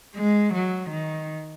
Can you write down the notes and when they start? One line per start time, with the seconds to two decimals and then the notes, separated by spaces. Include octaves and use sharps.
0.15 G#3
0.54 F#3
0.90 D#3